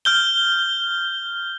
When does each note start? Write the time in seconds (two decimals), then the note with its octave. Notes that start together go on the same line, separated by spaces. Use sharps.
0.05 F6 G6 G7